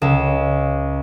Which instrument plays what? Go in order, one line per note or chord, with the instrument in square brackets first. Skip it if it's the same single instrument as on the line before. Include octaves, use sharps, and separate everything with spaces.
[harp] C#2 E7